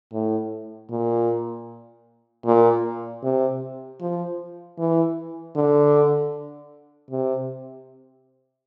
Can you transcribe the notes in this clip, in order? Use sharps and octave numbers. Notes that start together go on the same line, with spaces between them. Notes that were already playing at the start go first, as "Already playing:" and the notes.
A2
A#2
A#2
C3
F3
E3
D3
C3